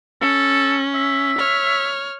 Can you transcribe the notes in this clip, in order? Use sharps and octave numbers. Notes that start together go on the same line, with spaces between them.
C#4 A4
E5
C#5 F6